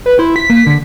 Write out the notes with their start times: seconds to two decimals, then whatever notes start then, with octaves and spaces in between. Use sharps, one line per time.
0.06 B4
0.19 E4 C5
0.36 B6
0.50 A#3
0.66 D3